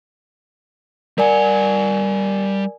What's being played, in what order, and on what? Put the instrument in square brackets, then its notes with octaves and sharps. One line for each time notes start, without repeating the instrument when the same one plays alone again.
[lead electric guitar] G3 F#5 [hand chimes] A#4 D5 G#5